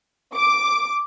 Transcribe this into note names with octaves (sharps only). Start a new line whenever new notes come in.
D6